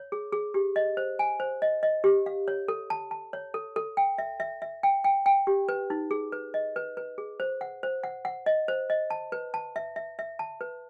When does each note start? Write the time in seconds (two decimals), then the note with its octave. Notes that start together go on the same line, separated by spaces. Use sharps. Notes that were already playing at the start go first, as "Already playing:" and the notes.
Already playing: C#5
0.12 G#4
0.33 G#4
0.54 G4
0.76 D#5
0.97 C5
1.19 G#5
1.40 C5
1.62 D#5
1.83 D#5
2.04 G4
2.26 F5
2.48 C#5
2.68 A4
2.90 A5
3.11 A5
3.33 C#5
3.54 A4
3.76 A4
3.97 G5
4.18 E5
4.40 E5
4.62 E5
4.83 G5
5.04 G5
5.26 G5
5.47 G4
5.69 B4
5.90 D#4
6.11 G#4
6.32 B4
6.54 D#5
6.76 B4
6.97 B4
7.18 G#4
7.40 C5
7.61 F#5
7.83 C5
8.04 F#5
8.25 F#5
8.46 D#5
8.68 C5
8.90 D#5
9.10 A5
9.32 B4
9.54 A5
9.76 E5
9.96 E5
10.19 E5
10.39 A5
10.61 B4